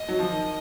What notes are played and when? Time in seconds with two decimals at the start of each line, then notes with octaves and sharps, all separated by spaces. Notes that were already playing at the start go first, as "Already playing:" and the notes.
Already playing: D#5
0.09 F#3
0.19 F3
0.31 D#3